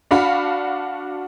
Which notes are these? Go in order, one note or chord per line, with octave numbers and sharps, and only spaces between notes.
D4 F#4 F5 B5